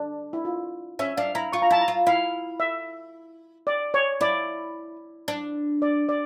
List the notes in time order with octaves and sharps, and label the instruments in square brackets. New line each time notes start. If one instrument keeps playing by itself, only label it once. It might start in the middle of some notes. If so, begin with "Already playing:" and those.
Already playing: [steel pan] D4
E4
F4
[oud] C#4 [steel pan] E5
[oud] D4 [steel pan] F5
[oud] E4 [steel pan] A#5
[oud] F4 [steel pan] C#6
[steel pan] A#5
[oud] E4 [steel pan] A5
[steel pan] A#5
[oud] F4
[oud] E4 [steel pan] F5
[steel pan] E5
D5
C#5
[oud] E4 [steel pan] D5
[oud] D4
[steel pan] D5
D5